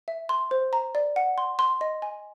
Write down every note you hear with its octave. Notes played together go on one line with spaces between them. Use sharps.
E5
C6
C5
A#5
D5
F#5
C6
C6
D#5
G#5